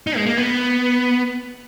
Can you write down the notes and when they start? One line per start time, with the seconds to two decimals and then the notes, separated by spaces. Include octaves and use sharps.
0.07 D#4
0.17 G#3
0.26 A#3
0.37 B3